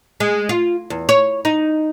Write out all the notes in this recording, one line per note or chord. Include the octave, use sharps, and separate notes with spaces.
G#3
F4
E2
C#5
D#4